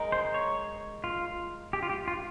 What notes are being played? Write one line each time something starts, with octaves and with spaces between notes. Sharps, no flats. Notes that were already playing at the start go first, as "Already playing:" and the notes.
Already playing: G#3 D#4 A#4
C5
C#5
F4
G4
F4
G4
F4